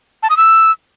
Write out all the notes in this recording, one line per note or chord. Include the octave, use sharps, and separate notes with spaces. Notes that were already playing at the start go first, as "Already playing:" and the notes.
A5
D#6
E6